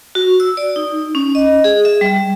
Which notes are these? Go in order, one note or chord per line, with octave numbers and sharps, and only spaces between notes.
F#4
E6
D5
D#4
C#4
D#5
G#4
E5
G3